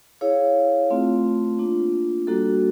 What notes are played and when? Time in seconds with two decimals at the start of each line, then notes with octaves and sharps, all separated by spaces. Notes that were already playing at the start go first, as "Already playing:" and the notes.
0.21 E4 G#4 C#5 F5
0.90 A3 C4 F4
1.59 A#3 D4 F4
2.27 G3 A#3 D4 F#4 A4